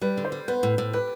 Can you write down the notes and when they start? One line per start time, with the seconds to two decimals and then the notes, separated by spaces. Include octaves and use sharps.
0.01 G3 B4
0.17 D3
0.25 C5
0.32 G3
0.48 B3 B4
0.63 A2
0.78 A2
0.93 G4 B4